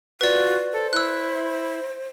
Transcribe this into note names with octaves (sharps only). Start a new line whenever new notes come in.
F4 F#4 B4 D5
A4 C5
E4 E6 F#6